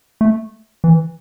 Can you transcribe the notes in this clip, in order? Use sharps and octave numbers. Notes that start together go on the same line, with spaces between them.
A3
E3